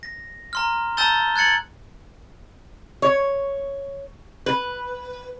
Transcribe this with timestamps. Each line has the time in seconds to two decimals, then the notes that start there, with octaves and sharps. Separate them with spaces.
0.03 A#6
0.53 A#5 C6 F6
0.97 A5 A#5 E6 G6 A6 G7
1.36 F#6 G#6 A6 C#7 F#7
3.02 C#5
4.46 B4